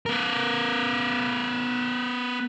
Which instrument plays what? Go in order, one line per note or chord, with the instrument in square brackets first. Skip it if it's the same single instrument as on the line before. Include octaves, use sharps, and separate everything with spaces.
[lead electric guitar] B3 A#4